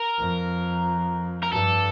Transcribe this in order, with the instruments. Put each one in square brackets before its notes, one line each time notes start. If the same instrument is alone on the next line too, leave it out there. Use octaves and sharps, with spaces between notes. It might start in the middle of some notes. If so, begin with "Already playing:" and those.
Already playing: [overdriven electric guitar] A#4
[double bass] F2
[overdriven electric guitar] A#4
[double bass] G2 [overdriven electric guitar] A4